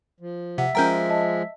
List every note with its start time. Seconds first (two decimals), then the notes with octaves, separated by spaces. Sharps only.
0.20 F3
0.58 C3 E5 F#5
0.75 F3 G#3 C#4 A#4 G5 A#5 G6
1.10 D#5 A5